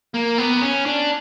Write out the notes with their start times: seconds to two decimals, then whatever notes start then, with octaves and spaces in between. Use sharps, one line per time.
0.14 A#3
0.38 B3
0.62 C#4
0.86 D4